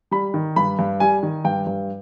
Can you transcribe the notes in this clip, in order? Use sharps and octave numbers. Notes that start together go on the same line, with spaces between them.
G3 B5
D#3
G2 B5
G2
G3 G#5
D#3
G2 G5
G2